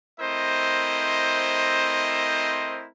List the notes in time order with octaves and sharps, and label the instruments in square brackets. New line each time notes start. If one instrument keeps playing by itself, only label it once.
[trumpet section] A3 C4 E4 A#4 C5 D#5